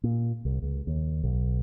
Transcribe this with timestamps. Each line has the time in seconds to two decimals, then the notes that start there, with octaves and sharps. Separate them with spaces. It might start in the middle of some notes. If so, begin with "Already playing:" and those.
0.04 A#2
0.45 C2
0.62 C#2
0.87 D#2
1.24 B1